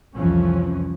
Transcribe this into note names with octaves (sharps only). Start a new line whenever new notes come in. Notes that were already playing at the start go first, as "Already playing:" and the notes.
C2 F2 E3 F3 C#4